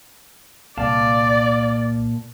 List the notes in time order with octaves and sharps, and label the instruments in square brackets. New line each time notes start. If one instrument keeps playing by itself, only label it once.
[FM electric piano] C2 [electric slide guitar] A#2 F5 A5 [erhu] D5